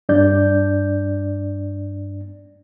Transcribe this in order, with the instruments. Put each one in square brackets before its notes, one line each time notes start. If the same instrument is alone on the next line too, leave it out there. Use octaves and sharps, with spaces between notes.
[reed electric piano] G2 D4 D5 G6